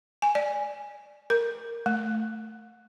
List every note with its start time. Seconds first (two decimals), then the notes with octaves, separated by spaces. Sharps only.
0.22 G#5
0.35 D5
1.30 A#4
1.86 A3